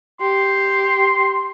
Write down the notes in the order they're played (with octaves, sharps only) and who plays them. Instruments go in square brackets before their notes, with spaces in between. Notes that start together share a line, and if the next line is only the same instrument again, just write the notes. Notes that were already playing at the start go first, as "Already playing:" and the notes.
[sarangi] G4 [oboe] C6